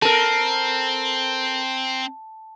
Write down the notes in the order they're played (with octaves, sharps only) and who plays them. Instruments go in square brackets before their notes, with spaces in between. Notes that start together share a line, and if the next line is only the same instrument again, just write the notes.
[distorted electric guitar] C4 [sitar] A4 A#4 [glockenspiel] A5